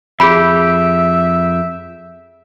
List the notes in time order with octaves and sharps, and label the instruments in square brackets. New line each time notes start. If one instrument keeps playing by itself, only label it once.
[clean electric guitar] F2 G4 [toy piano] G#4 B5 [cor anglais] E5